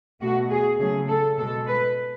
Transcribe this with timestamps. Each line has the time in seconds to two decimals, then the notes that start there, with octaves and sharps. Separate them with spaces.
0.21 B2 A3 F#4
0.51 G#4
0.79 C#3 F#3 A3 G#4
1.08 A4
1.37 B2 G#3 A4
1.68 B4